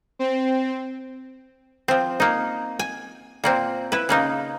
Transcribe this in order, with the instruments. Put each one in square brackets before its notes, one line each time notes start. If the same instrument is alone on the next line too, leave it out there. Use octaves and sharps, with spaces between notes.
[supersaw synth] C4
[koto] F3 C4
A#3 D#4
G#5
A#2 A#3 C4
E4 B4
C#3 A#3 D#4